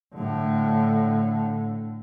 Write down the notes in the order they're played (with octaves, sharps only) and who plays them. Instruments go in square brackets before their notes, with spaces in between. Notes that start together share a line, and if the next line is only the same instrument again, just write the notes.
[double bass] A2 D3